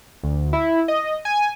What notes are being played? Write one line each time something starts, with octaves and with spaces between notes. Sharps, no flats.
D2
E4
D#5
G#5